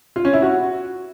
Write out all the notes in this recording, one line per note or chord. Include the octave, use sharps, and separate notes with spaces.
F4
C#4
E4
F#4